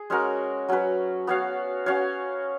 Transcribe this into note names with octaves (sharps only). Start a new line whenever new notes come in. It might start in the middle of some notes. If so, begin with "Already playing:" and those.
Already playing: G#4
G#3 C#4 F#4 A#4
F#3 C#4 F#4 B4
B3 F#4 C#5 F5
C#4 F#4 C#5 F5